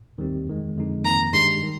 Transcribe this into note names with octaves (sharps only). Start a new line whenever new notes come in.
D#2 D#3 G3 C4 G4
F2 D#3 G#3
F2 D3 G#3 D#4
F2 D#3 A#3 A#5
G2 D#3 G#3 D4 G4 C6
D#3 G3